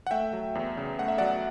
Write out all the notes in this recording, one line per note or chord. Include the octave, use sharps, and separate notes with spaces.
F#5
A3 E5 G5
F#3
E2
C#3
A3 F#5
E5
F#3 D5 F#5